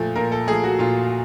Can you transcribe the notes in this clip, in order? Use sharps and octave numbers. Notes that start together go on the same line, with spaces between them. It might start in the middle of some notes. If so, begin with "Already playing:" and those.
Already playing: A#2 F3 A3
A#2 A#4
A4
F3 A3 G#4
F#4
A#2 F4